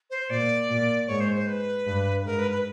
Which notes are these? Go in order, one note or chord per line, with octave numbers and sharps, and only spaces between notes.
C5
A#2 D5
A#2
G#2 C#5
C5
C5
B4
G2
G#2 A#4
B4
B4